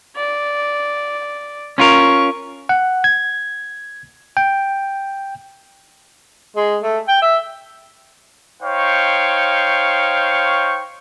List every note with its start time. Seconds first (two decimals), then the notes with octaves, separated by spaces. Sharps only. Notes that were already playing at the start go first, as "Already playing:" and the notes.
0.16 D5
1.78 C#4 F4 A#4 C#6
2.69 F#5
3.04 G#6
4.37 G5
6.56 G#3
6.82 A3
7.08 G5
7.22 E5
8.62 D#4 C5 C#5 F5 G5 C#6